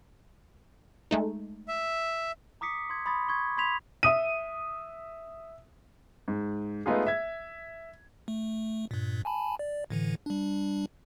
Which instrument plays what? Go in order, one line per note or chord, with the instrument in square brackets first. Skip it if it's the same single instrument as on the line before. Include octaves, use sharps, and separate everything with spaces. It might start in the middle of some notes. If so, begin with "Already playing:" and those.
[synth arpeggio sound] G#3 A3 D#4
[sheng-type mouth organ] E5
[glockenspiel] A#5 D6 D#6 B6 C#7
C6 G#6
B5 C6 D#6 A6
C#6 G#6
B5 C6 G#6 B6 F7
[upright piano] E5 D#6 D#7
G#2
G#3 A3 B3 D#4 F4 G#4
E5 G#6
[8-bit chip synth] A3
G2 A#2
G#5 A5 B5
D5
A2 D3 E3
G3 D4